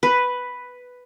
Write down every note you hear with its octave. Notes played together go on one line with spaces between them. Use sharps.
B4